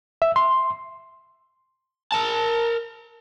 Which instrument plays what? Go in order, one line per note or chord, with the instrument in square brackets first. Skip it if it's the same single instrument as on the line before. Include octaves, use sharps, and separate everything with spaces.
[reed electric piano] E5
C6
[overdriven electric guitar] A#4 A5